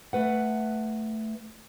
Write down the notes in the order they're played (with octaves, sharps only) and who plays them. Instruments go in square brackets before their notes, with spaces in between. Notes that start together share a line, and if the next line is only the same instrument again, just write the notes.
[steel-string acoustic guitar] A3 B4 F#5